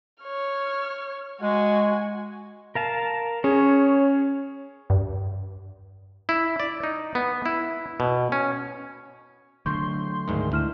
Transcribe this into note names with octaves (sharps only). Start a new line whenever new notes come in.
C#5 F6
G#3 F#4 G#5
A#4 F5 A5
C#4 G#4 C#5
G2
E4
D5
D#4
B3
E4
B2
C#4
D3 F#3 A3 C6 C#6 G6
D2 G#2 D#3
D2 E4 F6 E7